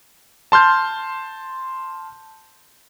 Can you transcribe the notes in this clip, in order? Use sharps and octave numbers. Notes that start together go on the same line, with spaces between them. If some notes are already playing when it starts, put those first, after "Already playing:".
A5 C6 F6 G6